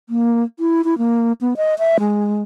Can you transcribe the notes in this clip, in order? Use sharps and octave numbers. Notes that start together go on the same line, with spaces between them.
A#3
E4
E4
A#3
B3
D#5
E5
G#3